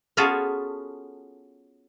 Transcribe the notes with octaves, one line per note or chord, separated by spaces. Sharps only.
B3 C#4 F4 F#4 G#4 A4